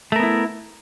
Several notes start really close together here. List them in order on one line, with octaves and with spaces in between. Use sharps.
A3 A#4 B3 E4